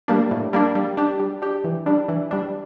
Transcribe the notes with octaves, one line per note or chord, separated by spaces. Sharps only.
G3 A#3 D4
A2
G3 A#3 D4
G3
D4 G4
G3
D4 G4
E3
G3 D4
E3
G3 D4